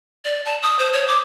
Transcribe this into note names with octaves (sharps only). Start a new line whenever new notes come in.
D5
A5
D#6
C5
C#5
D6